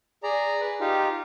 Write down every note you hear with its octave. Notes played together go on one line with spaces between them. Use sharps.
G#4 D5 A#5
B4
D#4 F4 G4